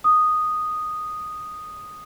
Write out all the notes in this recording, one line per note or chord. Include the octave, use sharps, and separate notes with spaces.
D#6